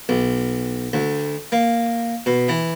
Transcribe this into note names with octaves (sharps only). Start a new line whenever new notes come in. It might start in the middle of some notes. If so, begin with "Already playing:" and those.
B1
D2
A#3
B2
E3